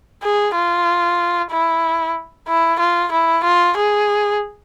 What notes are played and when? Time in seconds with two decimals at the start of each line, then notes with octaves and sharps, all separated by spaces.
0.23 G#4
0.55 F4
1.51 E4
2.48 E4
2.79 F4
3.12 E4
3.44 F4
3.77 G#4